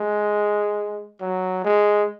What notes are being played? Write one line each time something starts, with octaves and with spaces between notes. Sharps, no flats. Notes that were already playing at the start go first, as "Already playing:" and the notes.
Already playing: G#3
F#3
G#3